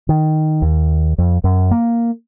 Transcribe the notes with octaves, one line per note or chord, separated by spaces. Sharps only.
D#3
D#2
F2
F#2
A#3